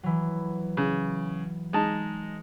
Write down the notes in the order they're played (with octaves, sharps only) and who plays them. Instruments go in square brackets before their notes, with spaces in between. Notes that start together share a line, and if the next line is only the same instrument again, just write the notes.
[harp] E3 F#3
[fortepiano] C#3
G#3 D#4 A5